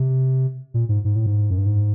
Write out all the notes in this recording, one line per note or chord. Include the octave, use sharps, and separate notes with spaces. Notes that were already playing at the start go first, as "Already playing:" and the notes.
Already playing: C3
A#2
G#2
G#2
A2
G#2
F#2
G2
G#2